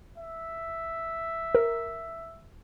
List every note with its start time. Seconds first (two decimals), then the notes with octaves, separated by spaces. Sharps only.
0.18 E5
1.55 A#4